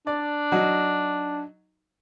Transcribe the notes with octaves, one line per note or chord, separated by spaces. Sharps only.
D4 D5
F#3 D#4 F#4